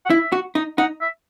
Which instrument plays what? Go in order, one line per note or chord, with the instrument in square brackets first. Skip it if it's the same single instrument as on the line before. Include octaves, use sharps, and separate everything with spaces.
[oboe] F#5
[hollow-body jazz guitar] E4 [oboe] E5
[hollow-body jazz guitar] F#4
D#4
[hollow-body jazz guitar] D#4 [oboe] F#5
[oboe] E5